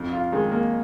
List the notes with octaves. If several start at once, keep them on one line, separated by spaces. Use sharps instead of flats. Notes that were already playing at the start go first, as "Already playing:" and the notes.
Already playing: F2
F4
D#3 G#3
A#3